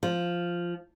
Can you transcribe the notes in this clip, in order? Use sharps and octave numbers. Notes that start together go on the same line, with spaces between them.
F3